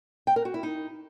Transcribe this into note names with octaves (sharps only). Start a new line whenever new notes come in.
G5
A#4
F#4
E4
D#4